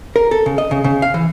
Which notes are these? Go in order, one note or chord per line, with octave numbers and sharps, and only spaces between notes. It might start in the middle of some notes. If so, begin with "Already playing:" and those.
A#4
A4
C#3
D#5
C#3
C#3
F5
E3